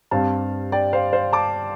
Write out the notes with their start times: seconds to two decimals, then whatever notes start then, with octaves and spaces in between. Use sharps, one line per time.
0.11 G2 G3 C4 F5 A5
0.72 D5 G5
0.93 C5 F5
1.13 C5 F5
1.33 A5 D6